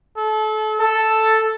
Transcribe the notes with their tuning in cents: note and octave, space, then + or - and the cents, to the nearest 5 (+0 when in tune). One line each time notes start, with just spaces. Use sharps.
A4 -30
A4 +0